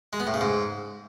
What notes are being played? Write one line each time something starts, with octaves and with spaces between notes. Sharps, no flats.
G#3
B3
A2
C#3
G#2